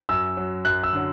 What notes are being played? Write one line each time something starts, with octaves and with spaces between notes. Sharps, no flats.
F#2 E6
F#3
F#2 F#6
E6
D3 F#3